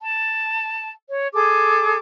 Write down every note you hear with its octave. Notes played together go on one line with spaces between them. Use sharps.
A5
C#5
G#4 A4 D6